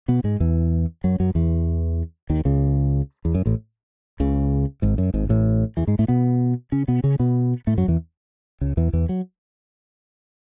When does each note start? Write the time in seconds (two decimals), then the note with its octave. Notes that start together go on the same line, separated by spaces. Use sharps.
0.08 B2 B3
0.24 G#2 G#3
0.40 E2 E3
1.04 F#2 F#3
1.20 F#2 F#3
1.35 E2 E3
2.30 D#2 D#3
2.45 C#2 C#3
3.25 E2
3.35 F#2
3.46 A1 A2
4.20 C#2 C#3
4.82 G#1 G#2
4.98 F#2
5.14 G#1 G#2
5.29 A1 A2
5.77 E2 E3
5.87 G#2 G#3
5.99 A2 A3
6.08 B2 B3
6.72 C#3 C#4
6.88 B2 B3
7.04 C#3 C#4
7.19 B2 B3
7.67 A2 A3
7.77 F#2 F#3
7.88 E2 E3
8.61 C#2 C#3
8.77 E2 E3
8.93 E2 E3
9.09 F#3